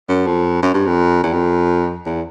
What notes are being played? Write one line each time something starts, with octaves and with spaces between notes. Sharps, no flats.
F#2
F2
F#2
G2
F2
E2
F2
E2